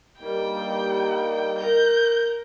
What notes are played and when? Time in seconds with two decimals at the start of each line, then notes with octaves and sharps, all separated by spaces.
0.21 G2 G3 A#3 D#4 G5
1.59 A#4 G6